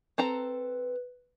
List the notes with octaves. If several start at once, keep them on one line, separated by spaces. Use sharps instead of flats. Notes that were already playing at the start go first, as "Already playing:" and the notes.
C4 A4 B4 A#5